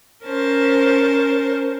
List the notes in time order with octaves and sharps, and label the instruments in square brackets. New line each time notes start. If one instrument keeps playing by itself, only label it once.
[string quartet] C#4 A#4 C5 A5